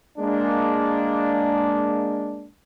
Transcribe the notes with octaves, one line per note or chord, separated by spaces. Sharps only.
G#3 A#3 D4